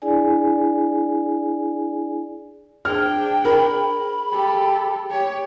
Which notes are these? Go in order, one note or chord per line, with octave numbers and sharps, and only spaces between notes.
D4 E4 G#4 D5 G#5
D4 G#4 C5 G5 F6
A#4 B5
G4 A4
G4 C#5